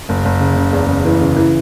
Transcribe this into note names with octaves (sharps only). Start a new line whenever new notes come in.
F#1
F#1
C#3
C#3
E2
C#3
E3
C#3
E3